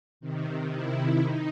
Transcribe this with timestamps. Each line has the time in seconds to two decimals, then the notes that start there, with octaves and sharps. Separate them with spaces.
0.21 C3 D#3
0.71 E4
1.21 D#4